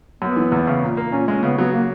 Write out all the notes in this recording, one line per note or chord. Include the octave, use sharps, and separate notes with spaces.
F#2 B3
E3
E2
C#3
A#2
A#3
A#2 C#4
G#3 C#4
C#3 B3
F#3 B3
A#3